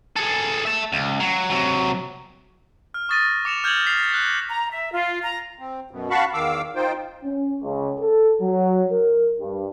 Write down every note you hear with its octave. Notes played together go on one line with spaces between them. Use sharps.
G#4 A4
E5 A5
C#2
F#3
C3 F#3
F6
C#6 D#6 A6 A#6 D#7
D6 C#7 E7 F7
F6 G6 G#6 F7 F#7
F6 B6 C7 F7 G7
F6 F#6 A#6
A#5
E5
F4
A#5
C4
F#2 B2
F#4 F5 F#5 A5 B5 C#6
E2 D#3 F5 D6 E6
D#4 F4 C5 G5
C#4
C#2
A4
F#3
A#4
G2